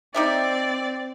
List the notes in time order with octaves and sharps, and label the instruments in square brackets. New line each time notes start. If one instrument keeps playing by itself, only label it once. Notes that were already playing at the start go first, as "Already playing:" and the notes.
[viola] C4 D5 [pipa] D#4 G4 E5